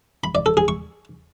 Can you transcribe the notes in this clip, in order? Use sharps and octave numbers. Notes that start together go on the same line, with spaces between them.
B5
D5
A4
G#4
C#6